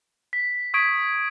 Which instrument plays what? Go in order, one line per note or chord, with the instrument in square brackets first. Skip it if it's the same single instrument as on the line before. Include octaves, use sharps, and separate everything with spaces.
[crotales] B6
C#6 D#6 G#6 B6 D7